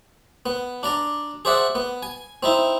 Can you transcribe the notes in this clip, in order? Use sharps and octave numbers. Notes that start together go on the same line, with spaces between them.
B3
D4 D5 A#5
G#4 C5 D5 E5 F#5
B3
G#5
C4 D#4 E4